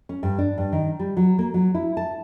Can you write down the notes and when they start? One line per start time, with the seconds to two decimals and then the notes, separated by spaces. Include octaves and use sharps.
0.09 C#4
0.23 G2
0.39 D4
0.58 G2
0.72 D#3
0.99 G3
1.17 F#3
1.39 A#3
1.54 F#3
1.75 E4
1.97 A5